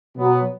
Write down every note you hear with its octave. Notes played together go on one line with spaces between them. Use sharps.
B2 F#3 B3